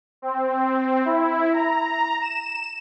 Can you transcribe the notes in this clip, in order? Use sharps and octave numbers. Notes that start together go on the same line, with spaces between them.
C4
E4
A#5
E7